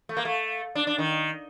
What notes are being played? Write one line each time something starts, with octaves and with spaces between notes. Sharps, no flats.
A3
A#3
A3
D4
D4
D#3